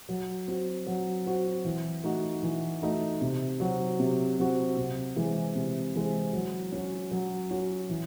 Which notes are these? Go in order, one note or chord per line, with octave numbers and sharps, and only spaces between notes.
F#3
C4 F#4
F#3
C4 F#4
E3
A3 D#4 F#4
E3
A3 D#4 F#4
C3
F#3 C4 F#4
C3
F#3 C4 F#4
C3
E3 G#3 C4
C3
E3 G#3 C4
F#3
C#4 F#4
F#3
C#4 F#4
E3